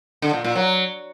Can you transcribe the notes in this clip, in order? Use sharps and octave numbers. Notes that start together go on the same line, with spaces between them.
D3
A#2
A#2
F#3